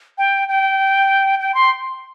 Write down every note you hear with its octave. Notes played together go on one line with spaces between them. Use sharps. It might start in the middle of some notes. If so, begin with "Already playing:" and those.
G5
G5
G5
C6